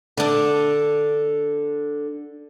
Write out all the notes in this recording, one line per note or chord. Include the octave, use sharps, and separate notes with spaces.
D3 D4